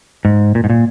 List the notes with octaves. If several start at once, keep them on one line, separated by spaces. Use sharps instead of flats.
G#2
A#2
G#2
A#2